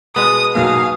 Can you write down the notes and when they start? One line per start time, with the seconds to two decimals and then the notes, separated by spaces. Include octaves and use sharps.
0.16 B2 G#3 B3 D#6
0.55 B1 F#3 A#3 F#4 F5 G#5 D#6